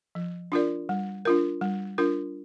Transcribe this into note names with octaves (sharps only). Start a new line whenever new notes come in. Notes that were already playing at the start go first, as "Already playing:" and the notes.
F3
D4 F4 A#4 D5
G3
D4 F4 A#4
G3
D4 F4 A#4